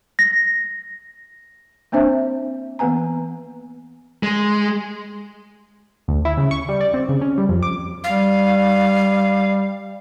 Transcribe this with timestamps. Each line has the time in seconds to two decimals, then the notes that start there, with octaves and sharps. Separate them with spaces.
0.19 A#6
1.92 A#3 C4 D4 C5 E5
2.79 E3 A#3 B3 B4 G#5 A#5
4.23 G#3
6.08 D2
6.25 E4
6.37 C#3
6.51 C#6
6.69 G3
6.81 D5
6.94 C4
7.09 C#3
7.21 C#4
7.38 G3
7.49 F2
7.63 D6
8.04 G3 F5